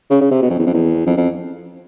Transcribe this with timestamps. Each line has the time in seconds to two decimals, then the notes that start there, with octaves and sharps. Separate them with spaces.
0.10 C#3
0.21 C#3
0.31 C3
0.42 B2
0.50 F2
0.59 E2
0.66 F2
0.73 E2
1.06 F2
1.17 F2